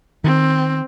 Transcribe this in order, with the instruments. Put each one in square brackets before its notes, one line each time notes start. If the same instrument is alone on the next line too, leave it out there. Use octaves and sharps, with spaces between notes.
[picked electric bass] D#3 [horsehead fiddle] C4